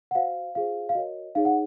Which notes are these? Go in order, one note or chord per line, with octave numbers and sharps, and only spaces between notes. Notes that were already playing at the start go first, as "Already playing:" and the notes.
F#5
F#4 C5 F5
F4 G#4 C5 F5
F5
F#4 A#4 C#5 D#5
D#4 G#4 C#5 F5
F#5